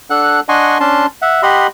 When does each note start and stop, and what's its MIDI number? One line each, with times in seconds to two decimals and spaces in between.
0.10 0.40 62
0.10 0.40 69
0.10 0.40 78
0.10 0.40 90
0.49 0.78 62
0.49 0.78 75
0.49 0.78 78
0.49 0.78 80
0.49 0.78 84
0.49 0.78 85
0.80 1.06 61
0.80 1.06 62
0.80 1.06 81
0.80 1.06 84
1.22 1.43 76
1.22 1.43 78
1.43 1.67 67
1.43 1.67 75
1.43 1.67 78
1.43 1.67 83
1.43 1.67 84